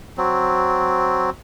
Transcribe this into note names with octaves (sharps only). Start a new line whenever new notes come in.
F#3 C4